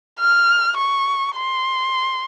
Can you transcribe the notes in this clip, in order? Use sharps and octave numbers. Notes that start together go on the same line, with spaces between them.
F6
C#6
C6